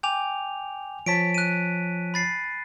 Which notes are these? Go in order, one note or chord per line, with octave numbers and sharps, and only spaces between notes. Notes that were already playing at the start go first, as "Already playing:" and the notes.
G5 G#5 D6 F7
F3 C#5 A5 B6 D7
F#6 D#7
B5 A6 C7